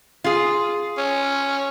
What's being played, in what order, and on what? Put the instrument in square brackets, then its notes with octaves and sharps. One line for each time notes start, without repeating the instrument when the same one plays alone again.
[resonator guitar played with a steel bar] F4 G#4
[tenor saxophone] C#4